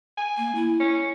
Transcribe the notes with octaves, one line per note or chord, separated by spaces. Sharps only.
G#5
A#3
E4
C#4